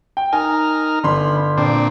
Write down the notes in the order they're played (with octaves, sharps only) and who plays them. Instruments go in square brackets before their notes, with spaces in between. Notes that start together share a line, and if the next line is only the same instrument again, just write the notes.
[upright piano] G5
[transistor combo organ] D#4 A#4 F6 [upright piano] G#5
[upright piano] G1 C6 [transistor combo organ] B5
[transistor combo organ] A#2 C4 D4